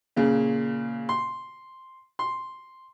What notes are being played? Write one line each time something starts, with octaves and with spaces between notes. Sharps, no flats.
A#2 C#3
C6
C6